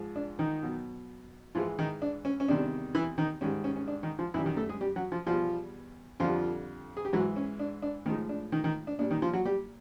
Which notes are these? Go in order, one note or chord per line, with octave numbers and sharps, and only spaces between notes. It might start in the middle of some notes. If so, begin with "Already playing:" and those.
Already playing: G#2 F3 G#3
D4
D#3 D#4
B2 F#3
G#2 E3 F3 G#3 F4
D#3 D#4
D4
C#4
C#4
E2 C3 D#3 G3 D4
E3 E4
D#3 D#4
G#2 D#3 G3 C#4
C#4
C#4
D4
D#3 D#4
F3 F4
F#2 D#3 E3 G3 E4
D#3 D#4
A3 A4
G#3 G#4
G3 G4
F#3 F#4
F3 F4
E2 B2 F3 G3 F4
F2 D3 F3 G3 F4
G#4
G4
G#2 E3 F#3 G#3 F#4
C#4
D4
D4
A2 D#3 F3 G#3 D#4
D4
D#3 D#4
D#3 D#4
D4
A#2 G3 D4
D#3 D#4
F3 F4
F#3 F#4
G3 G4